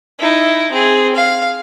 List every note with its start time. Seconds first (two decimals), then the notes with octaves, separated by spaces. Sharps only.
0.19 D#4 E4
0.72 C4 G#4
1.15 F5